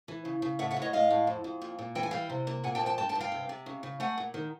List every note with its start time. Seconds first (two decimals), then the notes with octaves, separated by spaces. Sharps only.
0.08 E3
0.25 C#3
0.42 C#3
0.59 A2 E5 F#5
0.71 E5 F#5
0.77 A2
0.82 C#5 D#5
0.93 A2 D#5 F5
1.11 A2
1.27 F2
1.44 F2
1.62 A#2
1.79 A#2
1.95 E3 G5
2.03 G#5
2.11 G3 F5 G5
2.30 C3
2.47 A#3
2.64 A#2 F#5 G#5
2.75 G5 A5
2.81 F3
2.86 G5 A5
2.98 G2 G5 A5
3.09 G5 A5
3.15 G2
3.20 F5 G5
3.32 C3
3.49 C3
3.66 C#3
3.83 C#3
4.00 A3 F#5 G#5
4.18 A#2
4.34 D#3